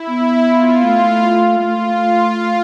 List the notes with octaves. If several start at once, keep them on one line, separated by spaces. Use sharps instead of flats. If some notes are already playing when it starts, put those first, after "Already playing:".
Already playing: E4
B3
F4
A3
A3 F4